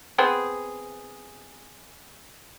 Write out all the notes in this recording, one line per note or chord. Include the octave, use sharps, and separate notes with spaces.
B3 C4 G#4